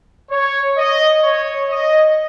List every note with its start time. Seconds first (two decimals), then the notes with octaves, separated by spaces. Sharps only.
0.31 C#5
0.77 D#5
1.23 C#5
1.69 D#5